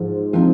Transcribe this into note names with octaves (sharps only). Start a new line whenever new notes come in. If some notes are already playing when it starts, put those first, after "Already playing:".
Already playing: G#2 F3
F3 C4 D#4